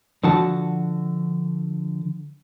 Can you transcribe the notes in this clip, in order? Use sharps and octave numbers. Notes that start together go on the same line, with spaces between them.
D3 F3 F#4 F#5 A5